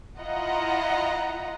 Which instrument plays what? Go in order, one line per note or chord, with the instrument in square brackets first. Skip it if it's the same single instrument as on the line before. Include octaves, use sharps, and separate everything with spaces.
[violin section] E4 F4 D#5 F#5 A#5